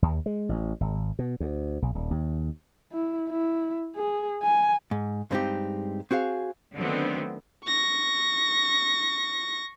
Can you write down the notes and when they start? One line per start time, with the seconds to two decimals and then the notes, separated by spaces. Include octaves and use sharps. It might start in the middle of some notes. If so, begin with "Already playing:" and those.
0.02 D#2
0.26 G#3
0.49 A1
0.81 G#1
1.19 B2
1.40 D2
1.82 B1
1.95 D#1
2.11 D#2
2.92 E4
3.29 E4
3.96 G#4
4.43 G#5
4.91 G#2
5.31 G2 G#3 C4 C#4 D#4 G4
6.11 C4 F#4 G#4 F5
6.76 D3 D#3 F#3 A3 B3 C4
7.66 C#6 A#6